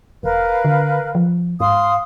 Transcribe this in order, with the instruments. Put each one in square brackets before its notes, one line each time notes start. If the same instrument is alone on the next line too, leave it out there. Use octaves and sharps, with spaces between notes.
[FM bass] E1 [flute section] A#4 B4 F5
[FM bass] D3
F3
[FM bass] G#2 [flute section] F5 C6 D#6